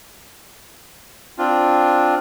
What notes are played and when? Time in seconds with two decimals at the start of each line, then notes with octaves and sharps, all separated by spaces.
1.38 C4 D4 F4